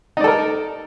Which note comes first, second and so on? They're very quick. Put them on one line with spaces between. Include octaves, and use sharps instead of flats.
D#4 D5 A4 A#4